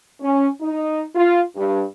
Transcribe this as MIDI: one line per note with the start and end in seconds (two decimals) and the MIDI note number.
0.21 0.47 61
0.61 1.02 63
1.15 1.40 65
1.55 1.82 43